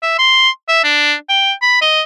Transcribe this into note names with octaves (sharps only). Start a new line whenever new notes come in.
E5
C6
E5
D4
G5
B5
D#5